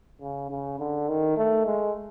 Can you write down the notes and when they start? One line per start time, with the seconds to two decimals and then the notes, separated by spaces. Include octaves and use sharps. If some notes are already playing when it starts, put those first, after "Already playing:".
0.22 C#3
0.51 C#3
0.79 D3
1.08 D#3
1.37 A3
1.66 G#3